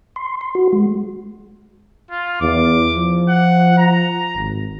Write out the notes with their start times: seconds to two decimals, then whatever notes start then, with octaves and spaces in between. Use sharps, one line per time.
0.16 C6
0.41 C6
0.55 F#4
0.73 G#3
2.11 F4
2.41 E2 D6
2.95 F3
3.29 F#5
3.78 A#5
4.35 G#1